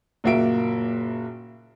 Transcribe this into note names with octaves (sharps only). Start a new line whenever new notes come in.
F#1 A#2 A#3 F#4 E5 D7